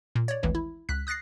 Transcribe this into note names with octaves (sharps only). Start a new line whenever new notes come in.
A#2
C#5 D5
G#1 D2 E3 G#3
E4
C#2 F#6 B6
D#6 F#6 A6 A#6 C7